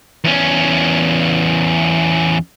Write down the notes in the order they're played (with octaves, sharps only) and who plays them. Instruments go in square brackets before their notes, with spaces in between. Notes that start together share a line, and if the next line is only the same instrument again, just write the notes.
[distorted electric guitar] E2 C#4